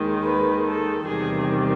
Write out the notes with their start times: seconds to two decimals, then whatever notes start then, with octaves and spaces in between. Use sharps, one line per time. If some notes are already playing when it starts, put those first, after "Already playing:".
Already playing: D#2 D#3 G#3
0.22 B4
0.65 A4
1.06 E2 C3 D#3 G3 G#4